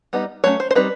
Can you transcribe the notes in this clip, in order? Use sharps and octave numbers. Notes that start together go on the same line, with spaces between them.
G3 B3 D#4
F#3 A3 C#4 C#5
C5
C5
G3 C4 D#4 B4